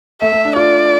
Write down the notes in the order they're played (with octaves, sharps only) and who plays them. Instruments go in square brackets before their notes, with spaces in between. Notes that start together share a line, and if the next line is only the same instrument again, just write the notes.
[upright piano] A3 [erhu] E5
[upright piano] A3
D4
[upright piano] F4 [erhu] D5